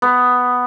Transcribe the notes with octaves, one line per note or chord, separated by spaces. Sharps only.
B3